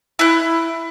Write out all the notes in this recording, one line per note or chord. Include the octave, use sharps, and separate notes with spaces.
E4 F#6